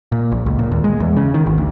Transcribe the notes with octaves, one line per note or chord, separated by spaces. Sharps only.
A#2
A#1
C#2
A#2
D#2
G#3
E2
C#3
D#3
G#1
D2